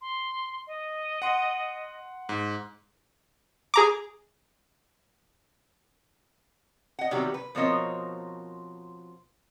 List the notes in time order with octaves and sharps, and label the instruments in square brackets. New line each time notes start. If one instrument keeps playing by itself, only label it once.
[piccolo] C6
D#5
[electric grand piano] F#5 C6
G#2
[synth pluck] G#4 A#5 D6
[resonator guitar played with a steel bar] D#5 F#5
C3 D#3 F#3 G3 B3 G4
B4
B2 F3 C4 A#4 C#5 D#5